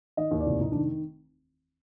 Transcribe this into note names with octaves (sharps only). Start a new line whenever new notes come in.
D#3 D#5
D#2
D5
F1
F1 D#4
D4
D#3